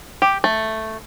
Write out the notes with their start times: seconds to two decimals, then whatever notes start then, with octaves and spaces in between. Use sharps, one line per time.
0.22 G4
0.44 A3